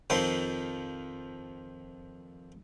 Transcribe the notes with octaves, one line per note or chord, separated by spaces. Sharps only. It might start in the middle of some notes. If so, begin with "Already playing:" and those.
F2 D#3 F3 C6